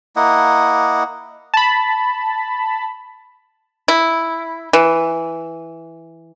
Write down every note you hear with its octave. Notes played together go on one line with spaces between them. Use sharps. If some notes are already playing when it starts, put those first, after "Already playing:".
A#3 E4 D#5 F#5
A5 B5
E4
E3